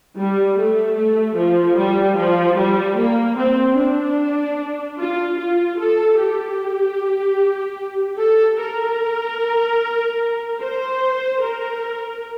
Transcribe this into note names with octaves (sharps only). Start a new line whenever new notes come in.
G3
A3
A3
F3
G3
F3
G3
A#3
C4
D4
F4
F4
A4
G4
A4
A#4
C5
A#4